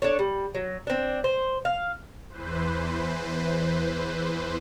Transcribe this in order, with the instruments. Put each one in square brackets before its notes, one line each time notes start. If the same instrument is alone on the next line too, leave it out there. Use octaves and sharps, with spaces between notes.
[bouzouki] D4 A4 C#5
G3
F#3
C4 D4
C5
F5
[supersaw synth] E2 E3 B4 C5